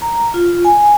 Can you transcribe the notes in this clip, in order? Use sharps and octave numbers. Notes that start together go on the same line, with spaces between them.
A#5
F4
G#5